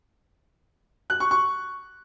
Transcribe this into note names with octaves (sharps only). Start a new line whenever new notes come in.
F#6
C#6
C#6